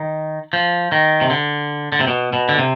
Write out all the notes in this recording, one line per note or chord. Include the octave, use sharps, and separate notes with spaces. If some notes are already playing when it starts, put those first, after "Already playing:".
Already playing: D#3
F3
D#3
C3
D3
D3
C3
B2
B2
D3
C3